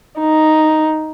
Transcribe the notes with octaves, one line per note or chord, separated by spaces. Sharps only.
D#4